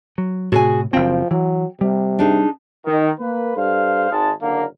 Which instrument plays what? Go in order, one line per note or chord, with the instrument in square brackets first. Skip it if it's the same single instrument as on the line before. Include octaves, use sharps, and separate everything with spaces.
[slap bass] F#3
[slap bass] A2 C3 [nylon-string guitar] F#4 G#4 G#5
[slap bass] F#1 C4 [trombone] F3 [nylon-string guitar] G5
[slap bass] E3 [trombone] F#3
[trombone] C3 [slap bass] G3
[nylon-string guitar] D4 D#4 G#4
[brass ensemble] D#3
A#3 B4
G2 A4 C5 F5
G#1 D#3 G#3 A5
F#1 D3 A#3 A#4 F5